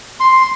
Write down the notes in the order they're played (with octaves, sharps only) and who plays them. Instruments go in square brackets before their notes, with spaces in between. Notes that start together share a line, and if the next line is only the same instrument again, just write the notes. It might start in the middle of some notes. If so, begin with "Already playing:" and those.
[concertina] C6